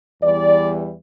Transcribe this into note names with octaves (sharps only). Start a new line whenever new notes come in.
E2 E3 G3 D5